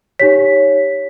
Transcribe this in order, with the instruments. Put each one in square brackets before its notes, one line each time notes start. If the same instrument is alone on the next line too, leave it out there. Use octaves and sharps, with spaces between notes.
[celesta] D#4 G4 C#5 B6